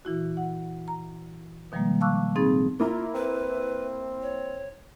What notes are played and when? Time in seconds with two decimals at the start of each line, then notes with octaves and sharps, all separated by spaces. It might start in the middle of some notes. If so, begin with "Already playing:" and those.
0.05 A#2 E3 E4 F#4
0.37 F#5
0.88 A#5
1.72 B2 D#3 F3 G3 G#3 A#3
2.01 F5 A5 C#6 D6 E6 F#6
2.36 A2 C4 D#4 G#4 B5 A6
2.80 A#3 E4 F4 A#5
3.14 C4 B4
4.22 C#5